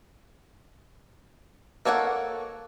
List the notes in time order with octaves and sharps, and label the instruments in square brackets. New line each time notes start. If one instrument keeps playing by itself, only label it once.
[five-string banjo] A#3 A4 C#5 D5 F#5